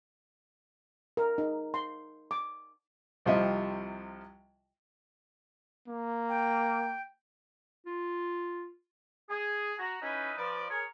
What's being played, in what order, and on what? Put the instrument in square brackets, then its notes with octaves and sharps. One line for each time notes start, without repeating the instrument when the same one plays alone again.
[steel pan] A#4
D#4
C6
D6
[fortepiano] C2 C3 F3 F4 D#5 E5
[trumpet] A#3
[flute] G5
[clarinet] F4
[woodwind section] G#4
F#4 A#5
C#4 D#4 E4 B4
F3 B4 D5
G#4 A#4 C#5